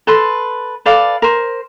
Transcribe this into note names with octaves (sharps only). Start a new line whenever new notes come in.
A4 B4 C6
A4 B4 D5 F5
A#4 C5